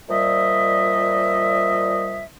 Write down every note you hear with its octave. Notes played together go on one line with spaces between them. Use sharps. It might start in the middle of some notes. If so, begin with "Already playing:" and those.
A#2 F3 G3 D#5 E5